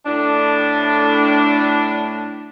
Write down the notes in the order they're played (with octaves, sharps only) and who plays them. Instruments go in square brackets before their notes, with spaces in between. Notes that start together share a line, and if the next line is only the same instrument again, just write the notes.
[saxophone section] A2 D4